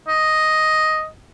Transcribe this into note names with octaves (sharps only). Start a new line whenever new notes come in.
D#5